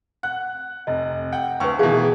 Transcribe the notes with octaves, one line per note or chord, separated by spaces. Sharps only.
F#5 F#6
F1 D#5
F#5 G5
D2 B4 G5 C#6
B2 D#3 E3 G#4 F5 A5